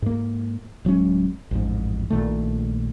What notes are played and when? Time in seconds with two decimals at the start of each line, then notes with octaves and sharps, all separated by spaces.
0.02 G#2 A#3
0.85 D1 F#3 G#3 C#4
1.51 A1 F2 G#2
2.10 A#1 A#2 D#3 A3